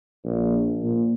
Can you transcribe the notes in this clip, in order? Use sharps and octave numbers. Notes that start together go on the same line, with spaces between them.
A#1
A#2